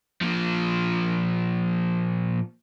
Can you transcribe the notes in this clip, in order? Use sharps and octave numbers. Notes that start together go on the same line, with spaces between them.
A#2 F3